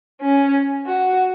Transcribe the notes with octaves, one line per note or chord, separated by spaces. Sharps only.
C#4
F#4